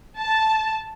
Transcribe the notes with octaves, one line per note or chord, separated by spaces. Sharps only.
A5